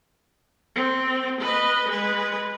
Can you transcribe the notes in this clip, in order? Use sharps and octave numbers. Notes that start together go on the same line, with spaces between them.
C4
B4 D#5
G#3 B4